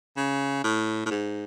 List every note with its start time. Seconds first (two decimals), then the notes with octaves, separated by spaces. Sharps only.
0.17 C#3
0.64 A2
1.06 A2
1.11 G#2